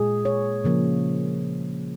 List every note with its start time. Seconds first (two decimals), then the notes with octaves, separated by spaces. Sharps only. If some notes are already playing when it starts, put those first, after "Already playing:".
Already playing: A#2 G#3 G#4
0.25 C#5
0.64 C#3 F3 A#3